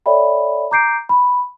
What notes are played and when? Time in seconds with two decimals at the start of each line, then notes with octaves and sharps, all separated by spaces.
0.06 A4 C#5 D5 E5 G5 B5
0.71 A#5 D6 G6 C7 D7
1.09 B5